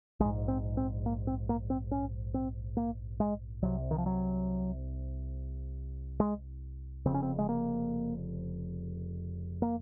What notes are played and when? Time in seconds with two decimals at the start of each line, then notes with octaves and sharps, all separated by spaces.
0.20 A#1 G#3
0.25 G#2
0.48 C4
0.77 C4
1.06 A#3
1.27 C4
1.49 A#3
1.70 C4
1.91 C#4
2.34 C4
2.77 A#3
3.20 G#3
3.62 C2 C3 F#3
3.91 D#3
3.98 F3
4.06 F#3
6.20 G#3
7.06 F1 F2 C#3 C4
7.14 C#4
7.23 C4
7.39 G#3
7.49 A#3
9.62 A#3